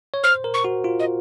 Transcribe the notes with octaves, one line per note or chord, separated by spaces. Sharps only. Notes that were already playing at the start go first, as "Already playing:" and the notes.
C#5
C5 F6
A#4
C#6
F#4
F4
D#5